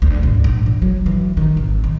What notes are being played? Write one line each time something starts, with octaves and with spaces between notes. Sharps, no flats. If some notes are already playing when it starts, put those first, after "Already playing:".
D2
G#2
A#1
E3
F#3
E3
D#3
G#1
D#3